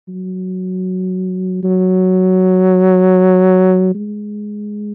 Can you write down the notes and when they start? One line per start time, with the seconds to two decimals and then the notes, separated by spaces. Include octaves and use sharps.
0.09 F#3
1.63 F#3
3.95 G#3